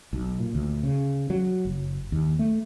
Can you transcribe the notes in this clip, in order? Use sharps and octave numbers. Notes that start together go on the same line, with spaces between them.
B1
A#2
D2
C#3
F#3
F#1
D#2
A3